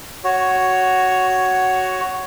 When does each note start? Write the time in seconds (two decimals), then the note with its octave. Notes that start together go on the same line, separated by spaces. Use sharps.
0.24 F#4 C#5